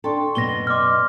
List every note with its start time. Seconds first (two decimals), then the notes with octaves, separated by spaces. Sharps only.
0.04 D4 A4 G5 C6 C#6
0.35 F#2 B2 B3 A#6 G7
0.67 D5 D#5 C6 D6 F6